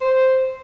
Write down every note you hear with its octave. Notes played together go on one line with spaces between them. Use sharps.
C5